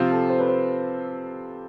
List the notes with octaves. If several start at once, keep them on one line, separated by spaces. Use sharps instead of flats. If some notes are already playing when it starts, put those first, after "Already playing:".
Already playing: C3 F3 C4 F4 G4
A4
C5
B4
C5